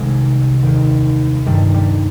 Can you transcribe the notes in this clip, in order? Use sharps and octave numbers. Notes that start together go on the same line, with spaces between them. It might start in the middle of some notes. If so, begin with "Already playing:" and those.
Already playing: C2 C3 D#3 G#3
D#2 D#3
G2 D#3 G3
G3